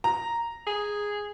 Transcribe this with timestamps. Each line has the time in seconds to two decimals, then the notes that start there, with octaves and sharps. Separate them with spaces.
0.04 A#5
0.67 G#4